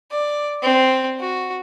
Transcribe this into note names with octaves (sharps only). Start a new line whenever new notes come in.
D5
C4
F#4